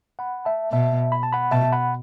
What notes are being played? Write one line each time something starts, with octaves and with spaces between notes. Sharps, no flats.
F#5 B5
E5 A5
B2 E5 A5
B5
A5
F#5 B5
B2 E5 A5
F#5 B5